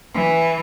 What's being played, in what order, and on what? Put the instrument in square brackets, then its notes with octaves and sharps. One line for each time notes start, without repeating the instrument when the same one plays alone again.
[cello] E3